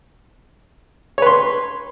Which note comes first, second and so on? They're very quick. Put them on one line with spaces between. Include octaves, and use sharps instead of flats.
C#5 B4 C6 C#6